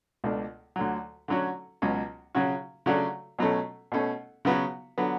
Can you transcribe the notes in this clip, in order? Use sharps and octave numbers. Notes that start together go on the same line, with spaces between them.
C#2 B2 A3 D4
D2 D3 F#3
D3 F#3 A3 C#4 F#4
C#2 B2 F#3 C#4
C#3 F#3 C#4 F#4
C#3 F#3 A3 D4 F#4
B2 F#3 A3 C#4
B2 A3 C#4
C#3 F#3 B3 F#4
D3 F#3 B3